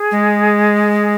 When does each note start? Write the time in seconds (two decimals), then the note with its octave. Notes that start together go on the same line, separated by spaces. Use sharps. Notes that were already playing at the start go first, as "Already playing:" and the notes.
Already playing: G#4
0.11 G#3